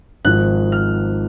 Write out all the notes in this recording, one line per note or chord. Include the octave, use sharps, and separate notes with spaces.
G#1 G#2 F3 F#6
F6